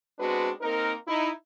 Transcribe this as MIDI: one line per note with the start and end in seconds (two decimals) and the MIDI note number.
0.19 0.50 56
0.19 0.50 59
0.19 0.50 60
0.19 0.50 62
0.19 0.50 66
0.19 0.50 71
0.61 0.93 58
0.61 0.93 60
0.61 0.93 63
0.61 0.93 70
1.06 1.29 63
1.06 1.29 64